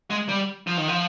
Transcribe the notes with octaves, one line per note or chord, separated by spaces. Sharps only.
G#3
G3
F3
D#3
F3